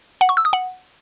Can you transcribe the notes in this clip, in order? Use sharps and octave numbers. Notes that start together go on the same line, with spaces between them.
F#5
C#6
E6
D#6
F#5